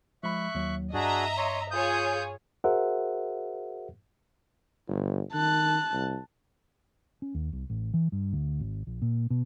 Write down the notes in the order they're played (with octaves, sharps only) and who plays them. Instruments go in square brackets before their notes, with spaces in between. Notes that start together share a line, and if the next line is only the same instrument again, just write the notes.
[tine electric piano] F3 G#3 B5 [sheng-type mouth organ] E5 C#6 F#6
[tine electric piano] D#2 F#3
[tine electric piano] G2 [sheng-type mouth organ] D4 F#4 G#4 [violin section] D#5 E5 A#5
[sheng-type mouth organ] C#5 C6
[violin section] F4 G#4 C#5 [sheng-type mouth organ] D#6 G6
[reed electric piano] F#4 G#4 A#4 C5 E5 F#5
[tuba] G1
[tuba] D#3 [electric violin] A5 F#6
[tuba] C2
[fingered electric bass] C#4
D#2
C2
A1
E3
G2
D2
G#1
A#1
A#2
B2